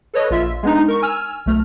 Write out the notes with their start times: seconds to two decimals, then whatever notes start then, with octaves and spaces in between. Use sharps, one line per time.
0.14 A4 B4 C#5 D#5
0.30 A#1 F4 E5
0.63 G#3 B3 D4 D#4
0.88 A#4 C#6
1.02 G#5 E6 F6
1.46 B1 A3 F6